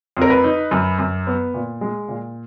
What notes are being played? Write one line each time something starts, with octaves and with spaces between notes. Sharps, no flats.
F2 A#4
B4
D#4
F#2
F#2
B3
A#2
G#3
A#2